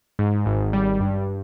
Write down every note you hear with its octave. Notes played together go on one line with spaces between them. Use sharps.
G#2
G#1
G3
G2